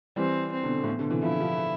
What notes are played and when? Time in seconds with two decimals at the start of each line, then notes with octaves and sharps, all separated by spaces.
0.16 E3 G3 C4
0.52 C4
0.63 B2 D3
0.76 B2
0.84 A2
0.87 B2
0.99 B2 D3
1.10 C3 E3
1.23 D3 F3 E4
1.40 D3 F3